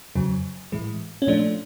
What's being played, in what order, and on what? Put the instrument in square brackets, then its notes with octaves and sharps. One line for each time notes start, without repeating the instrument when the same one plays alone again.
[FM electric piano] F2 C#3 F#3
A2 E3 G#3
C#4
A#2 F3 A3 D4